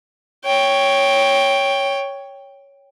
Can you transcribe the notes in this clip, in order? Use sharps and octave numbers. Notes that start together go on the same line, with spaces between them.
C#5 G5